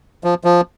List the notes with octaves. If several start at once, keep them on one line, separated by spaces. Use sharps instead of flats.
F3
F3